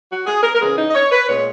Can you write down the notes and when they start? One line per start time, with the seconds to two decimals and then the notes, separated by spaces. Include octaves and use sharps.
0.10 F#4
0.26 G#4
0.43 A#4
0.54 A#4
0.60 C#3 E3 B3 G#4
0.77 D#4
0.89 D#5
0.95 C#5
1.11 B4
1.27 A#2 G#3 B3 C#5